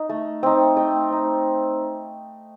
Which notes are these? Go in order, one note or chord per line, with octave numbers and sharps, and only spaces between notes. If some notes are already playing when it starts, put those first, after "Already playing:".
Already playing: D#4 D#5
A3
C4 D#4
A3 D#5 G5
C4 D#4